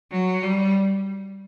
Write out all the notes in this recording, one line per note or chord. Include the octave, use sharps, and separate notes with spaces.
F#3
G3